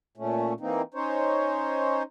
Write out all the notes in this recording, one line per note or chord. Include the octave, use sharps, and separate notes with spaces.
A#2 A3 C#4
E3 A#3 C4 D#4
C#4 D#4 C5 C#5